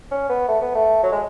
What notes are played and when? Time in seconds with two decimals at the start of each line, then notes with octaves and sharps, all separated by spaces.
0.11 C#4
0.29 B3
0.48 A3
0.61 B3
0.75 A3
1.03 F#3
1.12 G#3